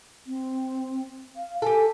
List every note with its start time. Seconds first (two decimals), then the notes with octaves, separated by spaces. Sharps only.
0.26 C4
1.37 F5
1.62 G4 A4 G#5